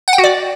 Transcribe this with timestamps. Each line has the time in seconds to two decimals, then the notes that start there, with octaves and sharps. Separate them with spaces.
0.08 F#5
0.13 G5
0.18 F#4
0.24 D5